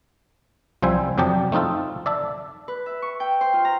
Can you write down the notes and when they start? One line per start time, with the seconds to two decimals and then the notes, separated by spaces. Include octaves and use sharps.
0.82 C2 F3 G3 C5 E5 G#5
1.18 F2 C3 F#3 G3 G4 A5
1.52 A3 C4 D#4 F4 A4
2.06 D5 E5 A5
2.68 B4
2.86 E5
3.02 C#6
3.20 G5
3.41 C5
3.53 F4
3.65 A#5